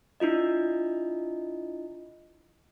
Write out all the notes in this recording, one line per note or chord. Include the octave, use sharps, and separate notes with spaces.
D4 E4 F4 D#5